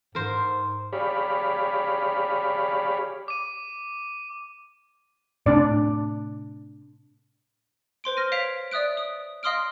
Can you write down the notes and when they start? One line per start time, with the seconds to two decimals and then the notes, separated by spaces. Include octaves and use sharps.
0.15 G#2 A#4 C5
0.93 G4 G#4 C#5 D5 F5 B5
3.28 D6 D#7
5.46 A2 C3 D4 D5
8.04 B4 C5 C6 D7
8.17 F6 A#6 D#7
8.32 C#5 F5 B6 C7 D7 F7
8.71 D5 E5 D#6 F#6 D7
8.97 D#6
9.43 D#5 F5 C6 D#6 F6 D7